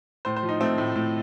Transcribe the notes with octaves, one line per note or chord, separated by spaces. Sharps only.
A2 C5
C5
F3
D#4
A3 C4
A2
A2